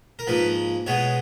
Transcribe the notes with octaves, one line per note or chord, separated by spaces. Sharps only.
A#4
G#2 F3 A#3 B4
B2 G#3 B3 C#5